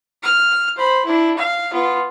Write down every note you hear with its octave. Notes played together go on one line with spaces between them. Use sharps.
F6
C5 B5
D4 E4
F5
B3 F4